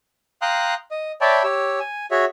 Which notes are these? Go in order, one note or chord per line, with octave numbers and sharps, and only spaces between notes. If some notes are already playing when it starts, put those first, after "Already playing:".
F5 G5 A#5 C6 D#6 F#6
D#5
C#5 D5 E5 G5 A5 B5
G4 C#5 E6
G#5
F#4 G#4 C#5 E5